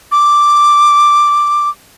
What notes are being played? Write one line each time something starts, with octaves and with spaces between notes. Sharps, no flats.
D6